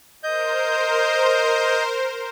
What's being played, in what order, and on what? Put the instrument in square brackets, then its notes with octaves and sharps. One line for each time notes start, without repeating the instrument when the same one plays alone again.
[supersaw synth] A#4 C5 [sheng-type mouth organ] D#5 G6